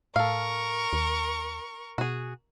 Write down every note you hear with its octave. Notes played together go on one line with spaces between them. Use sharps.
A2 A4 A#4 F5 C#6
D#2
B2 F#4 G#4